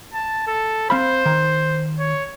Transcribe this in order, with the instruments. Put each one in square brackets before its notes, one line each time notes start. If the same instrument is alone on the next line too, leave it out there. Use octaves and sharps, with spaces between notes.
[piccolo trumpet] A5
A4
[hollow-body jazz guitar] C4 F5 B5 [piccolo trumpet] C5
[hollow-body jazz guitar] D#3
[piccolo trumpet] C#5